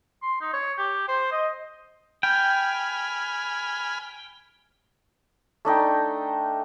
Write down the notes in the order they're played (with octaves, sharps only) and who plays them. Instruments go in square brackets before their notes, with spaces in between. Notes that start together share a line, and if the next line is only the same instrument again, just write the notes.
[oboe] C6
D#4
C#5
G4
C5
D#5
[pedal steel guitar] G5 [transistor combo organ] G#5 B5 F6
[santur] A3 D4 D#4 G5